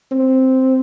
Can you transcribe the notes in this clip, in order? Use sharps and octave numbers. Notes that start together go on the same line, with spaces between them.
C4